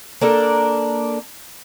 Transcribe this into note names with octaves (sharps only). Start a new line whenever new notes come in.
A#3 D4 A4 A#4